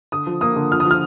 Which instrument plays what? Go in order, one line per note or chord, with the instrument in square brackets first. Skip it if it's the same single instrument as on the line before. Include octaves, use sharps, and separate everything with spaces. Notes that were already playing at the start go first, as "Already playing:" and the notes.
[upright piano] D3 D#6
F3
A#3 D#6
D3
F3 F6
D#6
F3 F6